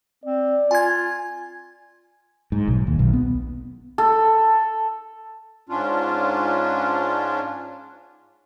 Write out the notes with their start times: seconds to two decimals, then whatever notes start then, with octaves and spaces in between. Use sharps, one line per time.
0.24 C4 D5
0.71 F4 G#5 G#6
2.52 G#2
2.68 B1
2.87 D#2
2.99 B1
3.13 B3
3.98 A4
5.69 G#2 C#4 D4 F4